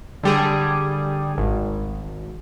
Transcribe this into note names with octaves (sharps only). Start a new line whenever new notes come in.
D3 G3 G#4
G#1